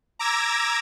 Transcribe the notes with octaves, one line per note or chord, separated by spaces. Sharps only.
A#5 D6 E6 G#6 A#6